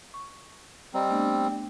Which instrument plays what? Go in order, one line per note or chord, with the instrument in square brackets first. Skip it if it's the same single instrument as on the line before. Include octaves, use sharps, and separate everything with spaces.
[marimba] C#6
[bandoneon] G3 C4 [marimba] D#5 A#5
[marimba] A3 B3 D4